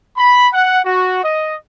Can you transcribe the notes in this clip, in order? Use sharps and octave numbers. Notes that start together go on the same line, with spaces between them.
B5
F#5
F#4
D#5